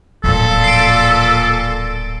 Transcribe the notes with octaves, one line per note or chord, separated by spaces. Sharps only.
D1 F2 A#2 A4
C7 D7